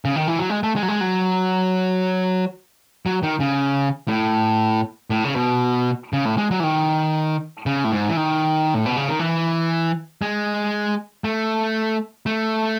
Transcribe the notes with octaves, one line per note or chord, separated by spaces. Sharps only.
C#3
D#3
E3
F#3
G#3
A3
G#3
F#3
G#3
F#3
F#3
D#3
C#3
A2
A2
C#3
B2
C#3
A2
G#3
F#3
E3
D#3
C#3
A2
G#2
E3
D#3
A2
B2
C#3
D#3
E3
G#3
A3
A3